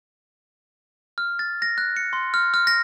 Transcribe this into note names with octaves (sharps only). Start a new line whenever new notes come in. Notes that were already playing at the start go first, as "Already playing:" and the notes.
F6
A6
A#6
F#6
C#7
C6
F6
F6
A#6